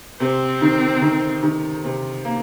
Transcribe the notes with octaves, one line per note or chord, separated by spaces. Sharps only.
C3 C4
D#3
D#3
D#3
C3
A#3